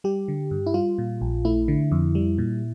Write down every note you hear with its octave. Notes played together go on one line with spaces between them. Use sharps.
G3 G4
D3
G2
E4
G3 F4
A#2
A#1
A3 E4
D3
F2
G3
A#2